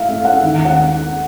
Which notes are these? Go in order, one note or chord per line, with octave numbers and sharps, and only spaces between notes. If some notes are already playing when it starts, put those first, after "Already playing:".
Already playing: A2 E5 F5
A3
F#5
D#2
F#5